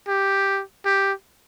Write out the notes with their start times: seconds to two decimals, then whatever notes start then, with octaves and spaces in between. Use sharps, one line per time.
0.08 G4
0.85 G4